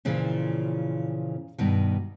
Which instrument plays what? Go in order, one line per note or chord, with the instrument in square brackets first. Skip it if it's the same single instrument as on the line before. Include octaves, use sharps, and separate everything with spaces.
[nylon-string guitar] A#2 C#3 E3 F3
G2 B2 D#3